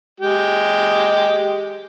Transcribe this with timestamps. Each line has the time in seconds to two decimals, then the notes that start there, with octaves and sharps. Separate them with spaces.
0.20 G#3 G4